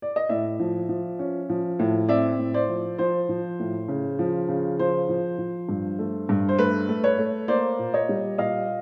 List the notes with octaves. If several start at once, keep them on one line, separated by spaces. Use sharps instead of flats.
D5
D#5
A2 D5 E5
F3
F3
C#4
F3
A2
C4 D5 E5
A2
C5 D5
F3
F3 C5
F3
A2
C#3
F3
C#3
F3 C5
F3
F3
G2
A3
G2
C5
A3 B4
A3
B4 C#5
A3
A#3 C5 D5
A#2
C#5 D#5
G3
A#2 D#5 F5